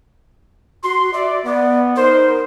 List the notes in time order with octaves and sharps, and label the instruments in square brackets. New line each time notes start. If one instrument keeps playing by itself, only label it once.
[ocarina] F#4 [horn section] C6
[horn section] D5 [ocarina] E5
[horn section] B3 [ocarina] D5
[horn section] D#4 C5 [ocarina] A#4